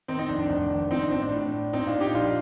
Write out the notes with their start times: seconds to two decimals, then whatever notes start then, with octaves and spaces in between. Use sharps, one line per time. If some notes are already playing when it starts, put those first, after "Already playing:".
0.08 D#3 C4 D#4
0.19 C4 D#4
0.29 F1 D4
0.39 D4
0.50 F1 D4
0.70 D#3
0.91 F3 C4 D#4
1.01 D4
1.11 A1 C4
1.22 D4
1.33 A2
1.52 A2
1.73 A#2 C4 D#4
1.87 D4 F4
1.93 A#2
2.00 D#4 G4
2.14 A#1 D4 F4